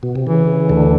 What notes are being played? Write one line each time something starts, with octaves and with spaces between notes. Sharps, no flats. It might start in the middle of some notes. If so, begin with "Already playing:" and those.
B2
C3
C#3 E3
D2 D3